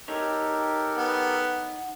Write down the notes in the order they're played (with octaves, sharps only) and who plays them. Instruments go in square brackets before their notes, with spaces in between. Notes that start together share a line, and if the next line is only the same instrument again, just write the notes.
[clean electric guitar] D#4 C#5 [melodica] G4 A4 A#4
[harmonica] B3 [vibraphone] F#5